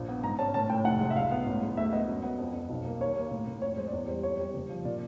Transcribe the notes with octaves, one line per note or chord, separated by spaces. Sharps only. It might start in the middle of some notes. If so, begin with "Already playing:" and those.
Already playing: A#1
B3
G#2 A#5
C#4 A5
A2 A5
A2 G5
F1 F#5
G#3
E5
C#2 F5
B3
A1
G#3
D2 E5
B3 D#5
F#2
B3
F2
F2
B1
A#3
D#2 C#5
A#3
A2
A2
F2 C#5
G#3 C5
D5
E2 C#5
G3 C5
F2 C#5
G3
F#1
F3
A#2 D5